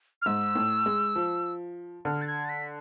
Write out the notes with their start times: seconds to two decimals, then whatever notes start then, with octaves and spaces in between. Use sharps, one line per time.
0.22 F6
0.26 G#2 E6
0.56 A2
0.86 G#3
1.16 F3
2.05 D3 F6
2.22 A6
2.27 G#6
2.45 A6
2.49 B6